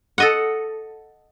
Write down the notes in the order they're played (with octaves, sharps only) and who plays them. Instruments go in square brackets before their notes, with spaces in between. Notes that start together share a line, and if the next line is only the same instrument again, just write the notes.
[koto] A4 D#5 F#5